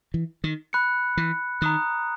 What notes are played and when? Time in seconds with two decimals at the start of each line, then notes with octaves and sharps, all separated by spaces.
0.14 E3
0.44 D#3
0.73 B5 F#6 C#7
1.17 E3
1.61 D#3 A#5 D#6 F#6